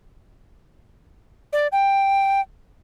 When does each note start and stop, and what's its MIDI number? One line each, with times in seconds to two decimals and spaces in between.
1.53 1.67 74
1.72 2.40 79